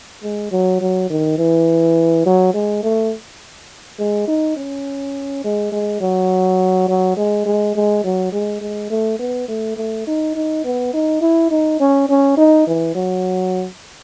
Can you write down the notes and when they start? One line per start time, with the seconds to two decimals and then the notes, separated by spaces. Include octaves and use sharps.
0.24 G#3
0.52 F#3
0.81 F#3
1.10 D#3
1.38 E3
2.26 F#3
2.54 G#3
2.83 A3
3.99 G#3
4.28 D#4
4.56 C#4
5.44 G#3
5.72 G#3
6.01 F#3
6.89 F#3
7.17 G#3
7.46 G#3
7.75 G#3
8.04 F#3
8.32 G#3
8.61 G#3
8.90 A3
9.19 B3
9.48 A3
9.77 A3
10.07 D#4
10.35 D#4
10.64 B3
10.94 D#4
11.21 E4
11.51 D#4
11.80 C#4
12.09 C#4
12.37 D#4
12.67 E3
12.95 F#3